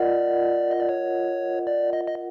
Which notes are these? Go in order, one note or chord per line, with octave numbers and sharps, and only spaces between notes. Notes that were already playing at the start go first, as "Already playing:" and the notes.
Already playing: F4 A#4 D5 D#5 F#5
D#5
D5
C#5
D5
D#5
D#5